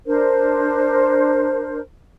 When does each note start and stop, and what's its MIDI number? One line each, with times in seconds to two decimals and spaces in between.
0.06 1.80 62
0.06 1.80 70
0.06 1.80 72